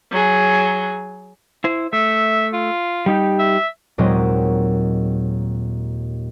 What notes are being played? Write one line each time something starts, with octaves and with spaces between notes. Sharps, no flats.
F#3 G#4
E4 C5
A3 E5
F4
G3 D#4 G4
E5
D#2 A#2 F#3 G#3 C4 D#5